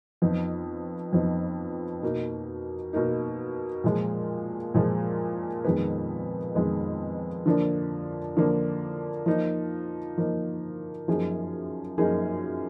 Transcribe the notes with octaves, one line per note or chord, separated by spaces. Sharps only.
F2 F3 B3 D#4
F2 F3 B3 D#4
B2 A#3 D#4
B2 A#3 D#4
A#2 F3 G#3
A#2 F3 G#3
F2 D#3 G#3 B3
F2 D#3 G#3 B3
D3 F3 A#3 D4
D3 F3 A#3 D4
F3 A#3 D#4
F3 A#3 D#4
F#2 F3 A#3 D#4 G#4
F#2 F3 A#3 D#4 G#4